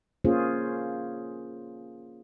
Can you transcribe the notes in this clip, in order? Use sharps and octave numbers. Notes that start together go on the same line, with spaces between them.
A#3 C#4 F4 G#4 C5